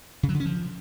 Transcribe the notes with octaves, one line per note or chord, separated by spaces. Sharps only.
C#3
F#3
D3
C#4
F3